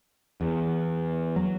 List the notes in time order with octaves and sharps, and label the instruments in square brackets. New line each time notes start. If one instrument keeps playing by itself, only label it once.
[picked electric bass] E2
F#3